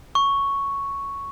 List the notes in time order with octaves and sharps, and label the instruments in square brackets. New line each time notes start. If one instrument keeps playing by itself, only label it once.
[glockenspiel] C#6